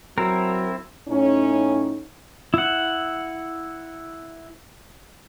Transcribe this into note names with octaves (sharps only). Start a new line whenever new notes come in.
F#3 C4 E4 A#4
A2 C#4 D#4
E4 F#5